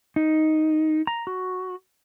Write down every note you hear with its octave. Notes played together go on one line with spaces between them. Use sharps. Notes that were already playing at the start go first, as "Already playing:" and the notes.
D#4
A#5
F#4